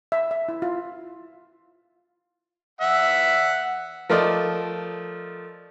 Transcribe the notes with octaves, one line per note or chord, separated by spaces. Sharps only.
E5
E5
E4
F4
E5 F#5
F3 A3 A#4 D5 D#5